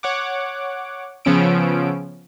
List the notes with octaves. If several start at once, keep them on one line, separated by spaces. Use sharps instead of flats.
C#5 F#5 D6
C#3 F3 B3 C#4 E6 D7